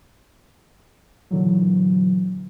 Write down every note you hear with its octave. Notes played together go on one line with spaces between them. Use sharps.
A#2 D3 E3 F#3